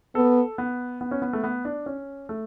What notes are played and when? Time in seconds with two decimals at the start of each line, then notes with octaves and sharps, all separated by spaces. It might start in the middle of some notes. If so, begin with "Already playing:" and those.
0.15 B3 A4
0.58 B3
1.01 B3
1.11 C#4
1.22 B3
1.33 A3
1.44 B3
1.65 D4
1.86 C#4
2.29 A3